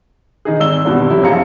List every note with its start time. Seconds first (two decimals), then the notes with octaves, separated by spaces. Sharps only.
0.45 D#3 D#4 G#4
0.60 G#1 E6 G7
0.85 G#1 E2 G2 B2
1.10 F#2 C3 E4
1.23 A#1 F2 G#4 F5 A#5 C#7